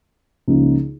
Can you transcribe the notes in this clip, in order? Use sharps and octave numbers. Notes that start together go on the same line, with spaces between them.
C#2 C#3 F3 A#3 D#4